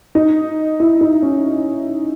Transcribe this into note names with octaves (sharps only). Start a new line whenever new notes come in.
D#4
E4
D#4
C#4